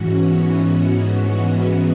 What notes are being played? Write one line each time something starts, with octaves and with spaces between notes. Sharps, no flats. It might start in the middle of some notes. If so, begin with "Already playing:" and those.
Already playing: G#2 E3 C#4 F#4
B3
G#3